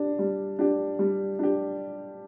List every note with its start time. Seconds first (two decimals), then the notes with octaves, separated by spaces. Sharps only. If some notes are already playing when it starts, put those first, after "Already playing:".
Already playing: D4 G4
0.19 G3
0.59 D4 G4
0.99 G3
1.39 D4 G4